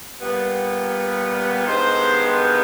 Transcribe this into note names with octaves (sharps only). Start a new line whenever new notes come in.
A#2 G3 B3
G2 D#3 G#3 B3 C5